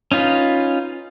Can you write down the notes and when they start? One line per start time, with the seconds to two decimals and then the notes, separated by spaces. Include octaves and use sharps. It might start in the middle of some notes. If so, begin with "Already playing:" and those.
0.12 C#4 D#4 F4 B4